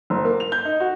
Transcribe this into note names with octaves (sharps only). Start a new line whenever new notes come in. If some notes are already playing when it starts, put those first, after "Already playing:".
F#1
A#3
F7
G6
D#4
F#4